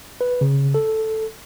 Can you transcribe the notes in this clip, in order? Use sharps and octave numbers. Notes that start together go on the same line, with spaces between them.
B4
C#3
A4